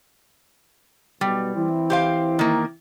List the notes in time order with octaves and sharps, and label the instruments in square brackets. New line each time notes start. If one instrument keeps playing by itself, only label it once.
[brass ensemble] B1 B2 [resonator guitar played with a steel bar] G3
[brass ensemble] E3 C4 E4
[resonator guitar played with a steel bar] G4 C5 F5
D#3 A#3